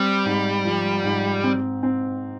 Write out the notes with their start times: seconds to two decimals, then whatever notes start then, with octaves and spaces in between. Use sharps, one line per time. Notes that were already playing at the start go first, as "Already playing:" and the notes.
Already playing: G3 C4
0.25 G#2
0.65 F3
1.04 G#2
1.44 C4
1.83 C4